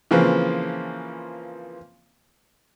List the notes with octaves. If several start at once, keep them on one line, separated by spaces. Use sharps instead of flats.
C#3 E3 F3 A#3 C4 B4